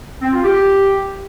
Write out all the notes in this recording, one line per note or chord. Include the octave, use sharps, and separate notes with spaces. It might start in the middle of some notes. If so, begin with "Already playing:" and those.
C4
F4
G4